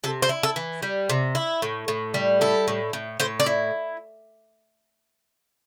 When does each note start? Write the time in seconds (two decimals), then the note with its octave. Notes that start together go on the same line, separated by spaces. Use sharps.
0.04 C3 A4
0.22 C5
0.29 E4
0.43 A4
0.56 E3
0.82 G3
1.10 C3
1.35 E4
1.62 A2
1.88 A2
2.14 G3
2.41 E4 A4
2.68 A2
2.93 A2
3.20 A2 C5
3.40 D5
3.46 E4